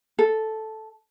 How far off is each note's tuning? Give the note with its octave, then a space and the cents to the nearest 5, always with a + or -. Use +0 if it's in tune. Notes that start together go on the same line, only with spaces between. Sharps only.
A4 -5